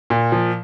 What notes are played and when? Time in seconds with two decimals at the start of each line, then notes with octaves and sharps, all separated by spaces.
0.10 A#2
0.32 F3